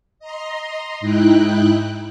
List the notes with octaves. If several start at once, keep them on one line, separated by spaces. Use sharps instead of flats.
D#5 A#5 C6
G#2 D#4 E4 G5 F#6